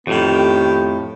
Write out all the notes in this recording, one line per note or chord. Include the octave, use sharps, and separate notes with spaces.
F2 A2 D#3 B3 G4